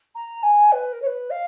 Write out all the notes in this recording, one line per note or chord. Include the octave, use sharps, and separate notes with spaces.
A#5
G#5
B4
A#4
C#5
B4
F5